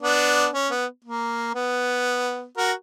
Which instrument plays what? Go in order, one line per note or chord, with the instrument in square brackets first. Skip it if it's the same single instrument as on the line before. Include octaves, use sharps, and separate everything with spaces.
[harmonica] B3 D4
C#4
B3
A#3
B3
F#4 A#4